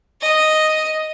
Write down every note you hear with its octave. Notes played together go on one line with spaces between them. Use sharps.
D#5